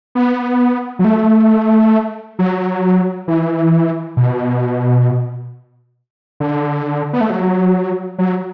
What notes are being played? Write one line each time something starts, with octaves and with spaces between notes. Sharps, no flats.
B3
F#3
A3
F#3
E3
B2
D3
B3
A3
F#3
F#3